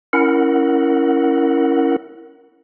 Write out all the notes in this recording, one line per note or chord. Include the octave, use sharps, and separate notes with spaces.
C#4 E4 A#4 F#5